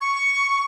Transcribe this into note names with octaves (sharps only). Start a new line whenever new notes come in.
C#6